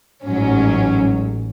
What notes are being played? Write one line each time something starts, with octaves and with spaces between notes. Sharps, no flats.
A1 G#2 F#3 C#4